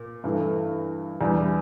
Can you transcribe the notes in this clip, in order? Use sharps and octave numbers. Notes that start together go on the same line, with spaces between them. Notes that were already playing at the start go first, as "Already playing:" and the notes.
Already playing: A#2
G2 E3 A3
E2 E3 G3 D4